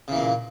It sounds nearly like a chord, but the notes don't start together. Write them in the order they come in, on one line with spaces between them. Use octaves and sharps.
C#3 E3 A#3 A#2